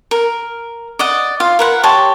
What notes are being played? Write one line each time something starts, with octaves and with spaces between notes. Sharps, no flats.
A#4
D5 D#5 F#5
F4 F5
A#4 B4 F#5
G4 C#5 A5 C6